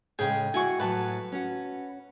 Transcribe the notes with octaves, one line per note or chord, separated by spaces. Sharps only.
A2 C#3 G#3 G#4 G5
E4 F#4 G#5 C#6
A2 F#3 B4 A5
C#4 F#4